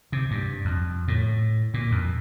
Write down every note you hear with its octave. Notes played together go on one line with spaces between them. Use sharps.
C3
G2
F2
A2
A#2
F2